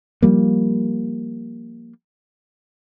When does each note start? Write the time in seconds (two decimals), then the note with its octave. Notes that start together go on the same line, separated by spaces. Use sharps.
0.22 F3 G3 A#3